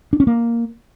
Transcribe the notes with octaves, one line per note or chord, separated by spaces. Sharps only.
D4
C#4
A#3